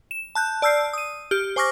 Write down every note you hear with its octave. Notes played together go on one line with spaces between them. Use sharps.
E7
A5 F#6 G6
D5 A5 E6 F6 G6 C7
D#6 D#7
G4 F6 G7
C5 G#5 C#6 D6 F6 A#6